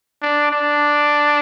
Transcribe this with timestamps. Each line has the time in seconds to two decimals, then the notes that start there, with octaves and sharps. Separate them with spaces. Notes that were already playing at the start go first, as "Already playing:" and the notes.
0.22 D4
0.51 D4